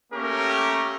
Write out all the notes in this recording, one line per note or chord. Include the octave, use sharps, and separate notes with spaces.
A3 A#3 C#4 G4 A#4